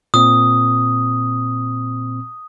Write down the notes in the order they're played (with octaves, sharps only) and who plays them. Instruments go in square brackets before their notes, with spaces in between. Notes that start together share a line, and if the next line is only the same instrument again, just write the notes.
[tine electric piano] A#2 C4 [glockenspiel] D#6